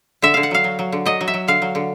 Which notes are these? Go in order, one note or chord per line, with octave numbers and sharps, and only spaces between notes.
D3 E5
D3 F5
F#5
F#3 F5
F#3
F#3
D3
F#3 D#5
F#3
E5
F#3
D3 F5
F#3
D3